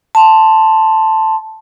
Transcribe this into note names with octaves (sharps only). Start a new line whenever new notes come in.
A5 C6